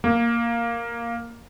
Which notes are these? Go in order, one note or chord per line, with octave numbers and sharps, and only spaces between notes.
A#3